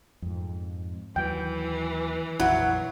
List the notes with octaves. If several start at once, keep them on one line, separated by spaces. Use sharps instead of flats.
F2 G#2
D#2 E3 F#3 G5
A#1 F2 F#3 E4 F#4